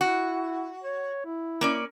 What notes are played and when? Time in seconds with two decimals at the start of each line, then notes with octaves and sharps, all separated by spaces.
0.01 E4 F#4
0.84 C#5
1.25 E4
1.61 A#3 C#4 D5